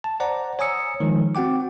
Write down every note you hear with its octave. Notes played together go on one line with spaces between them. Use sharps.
A5
C5 D5 F#5 A#5
C#5 G#5 A#5 D#6 E6 C#7
D#3 F3 G#3
C4 F#4 F#5 G5 D6